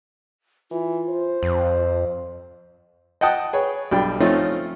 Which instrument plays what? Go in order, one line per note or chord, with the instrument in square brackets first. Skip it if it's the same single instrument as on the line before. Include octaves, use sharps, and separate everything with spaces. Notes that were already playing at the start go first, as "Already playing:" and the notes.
[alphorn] E3 [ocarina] F4
[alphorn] C5
[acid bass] F2
[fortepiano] D#5 F#5 G5 A5 D#6
G#4 B4 C#5
B1 G3 D4 G5
F3 A3 C4 C#4 D#4 F4